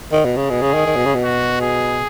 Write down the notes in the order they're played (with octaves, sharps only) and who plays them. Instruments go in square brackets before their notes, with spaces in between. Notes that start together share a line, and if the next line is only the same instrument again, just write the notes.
[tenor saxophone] D#3
B2
C#3
[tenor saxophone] B2 [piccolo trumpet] G#4
[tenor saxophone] C#3
D#3
D#3
B2
C#3
B2
[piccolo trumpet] F#4
G#4